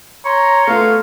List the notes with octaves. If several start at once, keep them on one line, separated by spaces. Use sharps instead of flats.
C#5 A#5 C6
A3 B3 F4 F5